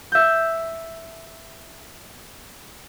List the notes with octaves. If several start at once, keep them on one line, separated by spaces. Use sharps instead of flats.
E5 G6